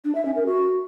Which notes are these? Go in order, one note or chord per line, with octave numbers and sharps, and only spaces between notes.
D4
E5
C#4
A#4
F#4